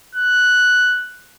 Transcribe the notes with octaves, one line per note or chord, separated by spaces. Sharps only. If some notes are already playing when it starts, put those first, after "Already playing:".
F#6